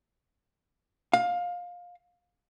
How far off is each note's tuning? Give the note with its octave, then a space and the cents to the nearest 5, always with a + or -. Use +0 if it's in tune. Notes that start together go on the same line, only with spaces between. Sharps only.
F5 +20